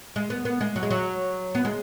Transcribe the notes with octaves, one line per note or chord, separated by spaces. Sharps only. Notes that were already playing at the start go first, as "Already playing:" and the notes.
G#3
B3
B3
G#3
F#3
G#3
F#3
B3
G#3